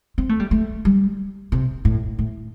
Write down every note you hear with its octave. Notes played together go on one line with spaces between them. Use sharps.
C4
A3
G3
A3
G3
C3
A2
A2